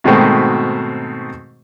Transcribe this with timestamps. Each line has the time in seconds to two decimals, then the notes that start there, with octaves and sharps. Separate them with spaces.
0.04 G#2 B2 D#3 A3 C4 F#4